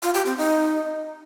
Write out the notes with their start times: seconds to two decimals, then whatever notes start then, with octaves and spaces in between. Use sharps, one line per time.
0.03 F4
0.14 G4
0.26 C4
0.37 D#4